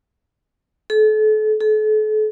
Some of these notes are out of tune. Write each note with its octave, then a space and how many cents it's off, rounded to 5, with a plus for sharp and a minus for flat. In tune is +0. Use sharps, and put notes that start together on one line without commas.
A4 -35
A4 -40